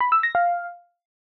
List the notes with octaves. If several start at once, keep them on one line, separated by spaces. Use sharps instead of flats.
B5
E6
A#6
F5